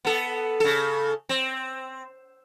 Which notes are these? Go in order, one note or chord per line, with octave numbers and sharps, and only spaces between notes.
B3 A4
C#3 A4
C4